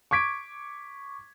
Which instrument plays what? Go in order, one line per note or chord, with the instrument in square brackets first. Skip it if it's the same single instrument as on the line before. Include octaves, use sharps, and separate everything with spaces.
[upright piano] C#6 D6 G#6 B6 D7